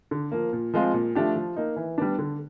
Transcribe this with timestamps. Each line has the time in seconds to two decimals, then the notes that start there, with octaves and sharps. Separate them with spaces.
0.11 D3
0.32 F3 A#3
0.53 A#2
0.74 F3 G#3 C4 F4
0.94 A#2
1.15 F3 A3 D4 G4
1.36 F3
1.56 A#3 D#4
1.76 E3
1.98 G3 B3 D4
2.19 D3